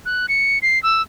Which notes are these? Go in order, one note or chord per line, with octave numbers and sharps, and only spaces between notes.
F#6
C#7
C7
E6